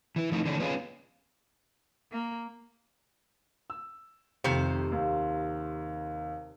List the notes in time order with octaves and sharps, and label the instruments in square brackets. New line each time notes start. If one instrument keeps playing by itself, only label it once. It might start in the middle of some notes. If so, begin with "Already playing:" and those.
[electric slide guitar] E3 E4
F3 A3 D#4 E4
D3 E3 A3 C#4 D4
B3 C#4 F4 G#4
[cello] A#3
[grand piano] E6
[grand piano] F1 F2 [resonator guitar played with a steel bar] C3 D#3 C5
[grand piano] D#2